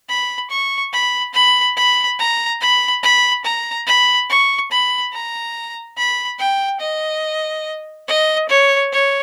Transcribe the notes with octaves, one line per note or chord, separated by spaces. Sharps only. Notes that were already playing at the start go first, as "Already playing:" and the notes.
B5
C#6
B5
B5
B5
A#5
B5
B5
A#5
B5
C#6
B5
A#5
B5
G5
D#5
D#5
C#5
C#5